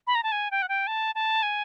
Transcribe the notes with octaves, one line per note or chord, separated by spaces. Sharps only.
B5
A#5
A5
G#5
G5
F#5
G5
A5
A5
G#5